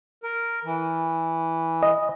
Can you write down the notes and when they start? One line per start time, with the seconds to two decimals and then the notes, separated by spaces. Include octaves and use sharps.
0.23 A#4
0.64 E3
1.83 D#5